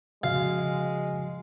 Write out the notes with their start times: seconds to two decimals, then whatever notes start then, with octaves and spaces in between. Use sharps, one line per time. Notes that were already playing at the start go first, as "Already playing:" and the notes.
0.24 C#3 F3 G#3 F#4 F5